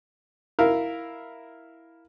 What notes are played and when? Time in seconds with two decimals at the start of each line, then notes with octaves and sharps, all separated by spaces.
0.59 E4 A#4 F5